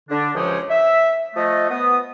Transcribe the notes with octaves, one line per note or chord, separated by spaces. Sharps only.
D3 D4
C#2 F#2 F3 G4 G#4 C#5
E5
F3 A3 D#5
B3 D#6